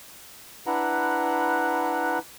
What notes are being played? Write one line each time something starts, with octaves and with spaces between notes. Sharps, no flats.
D4 E4 B4 F#5 A#5